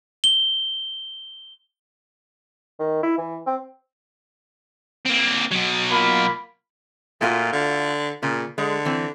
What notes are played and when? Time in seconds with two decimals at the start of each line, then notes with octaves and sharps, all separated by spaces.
0.24 G7
2.80 D#3
3.03 E4
3.18 E3
3.46 C4
5.05 A#3 C4
5.51 B2 F#3
5.91 A#3 F4 B5
7.21 A#2 A3 F4 F#4
7.53 D3
8.23 A#2 C#3
8.58 D3 G#3
8.86 E3 C4